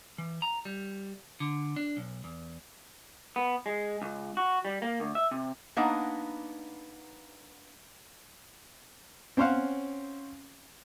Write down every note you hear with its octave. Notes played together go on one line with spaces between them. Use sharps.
E3
A#5
G3
D3
D4
B1
E2
B3
G#3
C#2
F#4
G3
A#3
D2
E5
C3
A#3 B3 D4 D#4 F#5
C4 C#4 C5 C#5 F5 F#5